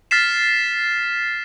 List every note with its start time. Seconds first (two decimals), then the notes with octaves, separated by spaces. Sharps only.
0.11 F6 A6 B6 C7 E7